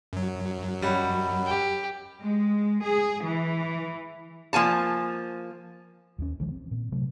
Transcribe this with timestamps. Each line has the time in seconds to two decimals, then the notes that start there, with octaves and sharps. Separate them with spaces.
0.13 F#2 F#3
0.82 G3 C#4 F#4 D#5 F#5 B5
1.46 G4
2.21 G#3
2.82 G#4
3.23 E3
4.53 F3 A#3 G#5 A5
6.18 D#2 G#3 C#4
6.39 B1 D#3 F3 G#3
6.52 C4
6.71 A#2
6.92 C3 F#3 A3